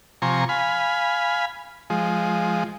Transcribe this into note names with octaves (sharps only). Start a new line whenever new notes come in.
C3 F3 G#5 A#5 C6 C#6
F5 G#5 B5
F3 G#3